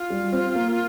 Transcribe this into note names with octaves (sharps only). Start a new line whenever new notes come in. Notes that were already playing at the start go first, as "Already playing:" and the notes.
Already playing: F4
G3
C4
A#3